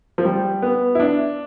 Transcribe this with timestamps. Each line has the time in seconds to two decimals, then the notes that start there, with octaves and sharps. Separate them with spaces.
0.18 F3
0.25 G3
0.62 B3
0.95 E4
1.00 D4